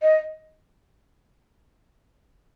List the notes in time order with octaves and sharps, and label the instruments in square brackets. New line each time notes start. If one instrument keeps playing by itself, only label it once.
[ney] D#5